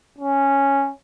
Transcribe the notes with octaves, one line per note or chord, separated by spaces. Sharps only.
C#4